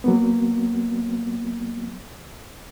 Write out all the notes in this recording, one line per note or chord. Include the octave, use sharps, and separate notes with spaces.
F#3 A#3 B3